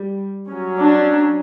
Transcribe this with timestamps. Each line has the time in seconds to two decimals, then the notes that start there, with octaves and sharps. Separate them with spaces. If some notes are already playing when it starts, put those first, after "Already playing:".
Already playing: G3
0.49 F#3 C#4
0.79 D4